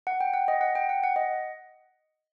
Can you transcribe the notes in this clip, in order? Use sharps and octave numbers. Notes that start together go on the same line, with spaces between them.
F#5
G5
F#5
D#5
F#5
G5
F#5
F#5
D#5